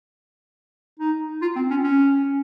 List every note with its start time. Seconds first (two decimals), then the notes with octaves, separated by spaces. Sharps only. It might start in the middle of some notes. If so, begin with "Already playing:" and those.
0.99 D#4
1.42 F4
1.56 C4
1.71 C#4
1.84 C#4